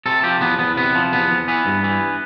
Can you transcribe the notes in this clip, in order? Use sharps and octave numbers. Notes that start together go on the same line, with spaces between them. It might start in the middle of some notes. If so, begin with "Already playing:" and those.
C3 A4
F3 G4
E2 B3
E2 B3
C3 B3
F3
E2 B3
E2
E3 B3
G2
E3